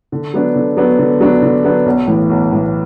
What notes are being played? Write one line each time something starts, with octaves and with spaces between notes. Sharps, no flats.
D3
F#3 B3 D4
D3
F#3 B3 D4
D3
F#3 B3 D4
D3
F#3 B3 D4
B1
A2 E3
B1
A2 E3